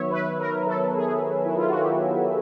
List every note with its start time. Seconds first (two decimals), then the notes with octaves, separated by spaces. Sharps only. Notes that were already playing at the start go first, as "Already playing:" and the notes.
Already playing: D#3 F#3 B3 C#5 E5
0.10 B4
0.39 A#4
0.67 A4
0.96 G#4
1.45 E4
1.56 F4
1.69 F#4
1.80 G4